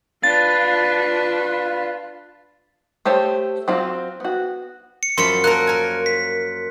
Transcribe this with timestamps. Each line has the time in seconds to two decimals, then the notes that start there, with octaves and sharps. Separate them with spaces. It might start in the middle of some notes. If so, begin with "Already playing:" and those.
0.23 D4 F4 B4 A6
3.05 A3 G4 C5 C#5
3.68 F#3 C4 F4
4.20 B3 F#4
5.03 C#7
5.18 F#2 F3 B5 C6 C#7
5.44 A#3 A4 A#4 F#6
5.67 A#4 G#5
6.06 B6